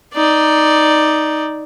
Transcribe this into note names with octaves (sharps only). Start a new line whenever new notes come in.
D#4 D5